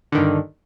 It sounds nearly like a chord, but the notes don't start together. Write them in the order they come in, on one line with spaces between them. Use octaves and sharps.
D3 D#3 G2